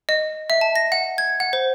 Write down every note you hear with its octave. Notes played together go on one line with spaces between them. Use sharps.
D#5
E5
A5
A#6
F#5
G#6
F#5
C5